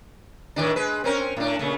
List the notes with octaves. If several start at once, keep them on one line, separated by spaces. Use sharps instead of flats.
A2 D#3 D4
G#3 B4
C4 C#4 A#4
A2 D4
A#2 C#3 A3